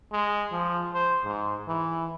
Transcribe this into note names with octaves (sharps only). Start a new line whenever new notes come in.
G#3
F3
C5
G#2
E3